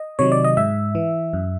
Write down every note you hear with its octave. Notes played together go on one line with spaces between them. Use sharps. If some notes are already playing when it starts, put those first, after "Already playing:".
Already playing: D#5
C3 D#3 F#3 C#5
D5
D#5
G#2 E5
E3
F#2